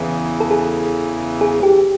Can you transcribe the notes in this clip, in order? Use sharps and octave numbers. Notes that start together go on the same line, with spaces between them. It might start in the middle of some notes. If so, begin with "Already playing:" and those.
Already playing: E2 C#3 E3
A4
G#4
G#4
G4